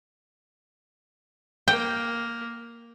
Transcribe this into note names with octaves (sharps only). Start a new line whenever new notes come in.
A#3 G5